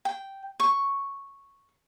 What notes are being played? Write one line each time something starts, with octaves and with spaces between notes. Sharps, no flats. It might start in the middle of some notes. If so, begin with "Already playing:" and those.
G5
C#6